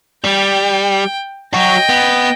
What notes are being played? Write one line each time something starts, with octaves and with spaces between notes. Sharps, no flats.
G3 G5
F#3 F#4 D#5 G5
B3